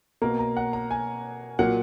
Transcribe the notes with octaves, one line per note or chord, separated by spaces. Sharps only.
B2 A#3 A#5
A#5
F#5
A#5
G#5
A#2 F#3 A#3 F#5